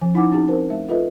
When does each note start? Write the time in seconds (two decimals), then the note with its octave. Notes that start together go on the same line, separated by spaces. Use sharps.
0.01 F3 C#4 G#5
0.14 C#4 D#4 E4 F#5 G#5 D6
0.31 C4 C#4 D#4 F#4 G#4 G#5
0.48 C4 F#4 A#4 C5
0.70 A3 E5 A5
0.89 F4 A4 B4 D#5 E5